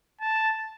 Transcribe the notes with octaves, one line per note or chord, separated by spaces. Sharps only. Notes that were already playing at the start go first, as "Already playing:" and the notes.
A5